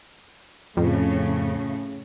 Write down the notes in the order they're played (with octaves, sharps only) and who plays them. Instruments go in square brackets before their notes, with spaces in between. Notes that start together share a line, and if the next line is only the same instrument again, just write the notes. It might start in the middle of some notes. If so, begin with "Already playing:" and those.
[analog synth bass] F2 [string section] A2 C#3